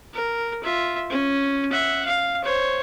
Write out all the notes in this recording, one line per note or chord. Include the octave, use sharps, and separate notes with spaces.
A#4
F4 E5
C#4
E5 F#5
F5
C5 C#5